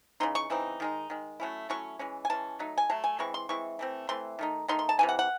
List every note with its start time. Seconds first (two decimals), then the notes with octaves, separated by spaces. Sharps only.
0.20 C#3 E3 C4 D#4 C6
0.35 C#6
0.50 C#3 E3 C4 D#4
0.80 D#3 G#3 D#4
1.10 D#3 G#3
1.40 F#3 A3 C#4 E4
1.70 F#3 A3 C#4 E4 C#6
1.99 E3 G#3 C#4
2.25 G#5
2.29 E3 G#3 C#4 A5
2.59 F#3 A3 D#4
2.78 G#5
2.90 F#3 A3 A5
3.04 G#5
3.19 E3 G#3 C4 E4 C#6
3.34 C6
3.49 E3 G#3 C4 E4 C#6
3.79 E3 A3 C4
4.09 E3 A3 C4 C6
4.39 D#3 A3 D#4
4.68 D#3 A3 D#4 C6
4.79 C6
4.89 A5
4.99 C3 E3 A3 G#5
5.09 F#5
5.19 F#5